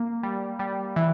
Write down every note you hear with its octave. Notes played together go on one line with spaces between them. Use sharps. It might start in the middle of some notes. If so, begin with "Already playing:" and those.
Already playing: A#3
G3
G3
E3